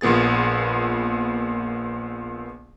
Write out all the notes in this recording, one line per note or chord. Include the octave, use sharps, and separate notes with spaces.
A#1 A#2 B3 G#4 A6